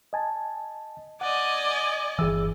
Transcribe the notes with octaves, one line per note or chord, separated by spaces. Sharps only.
D#5 G#5 A5
D5 D#5 F#5 G#5
G1 E3 G#4 E6